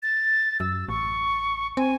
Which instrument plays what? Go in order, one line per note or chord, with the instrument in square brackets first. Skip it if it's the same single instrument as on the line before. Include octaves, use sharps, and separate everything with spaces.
[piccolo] A6
[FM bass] F#2 [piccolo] E6
[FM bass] A1 [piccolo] C#6
[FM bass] C4 [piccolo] G#5